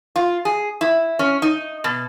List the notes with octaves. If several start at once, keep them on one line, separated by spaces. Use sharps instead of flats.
F4
G#4
E4
C#4
D#4
B2